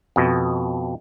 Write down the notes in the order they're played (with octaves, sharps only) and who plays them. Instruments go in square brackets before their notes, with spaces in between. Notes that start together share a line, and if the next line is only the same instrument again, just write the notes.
[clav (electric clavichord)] F2 B2